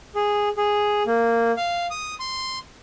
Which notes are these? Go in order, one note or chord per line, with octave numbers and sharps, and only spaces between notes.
G#4
G#4
A#3
F5
D#6
C6